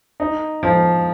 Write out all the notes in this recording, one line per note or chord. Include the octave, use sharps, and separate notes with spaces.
D#4
F3